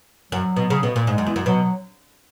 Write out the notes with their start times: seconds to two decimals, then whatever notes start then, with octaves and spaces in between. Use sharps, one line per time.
0.32 F#2 F#3
0.56 B2
0.70 C#3
0.83 B2
0.96 A#2
1.07 G#2 G#3
1.18 F#2
1.27 E2
1.36 F#2
1.46 B2 F#3